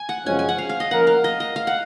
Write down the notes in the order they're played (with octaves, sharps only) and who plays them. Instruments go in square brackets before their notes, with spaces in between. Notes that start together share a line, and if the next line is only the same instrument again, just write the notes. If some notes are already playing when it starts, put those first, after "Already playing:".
Already playing: [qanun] G#5
F#5
[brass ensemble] F#2 C#3 F3 G#3 C#4 [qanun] G#5
[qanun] G#5
F#5
F5
F5
D#5
[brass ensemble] F3 A#3 C#4 F4 A#4 [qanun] F#5
[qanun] F5
D#5
D#5
F5
F#5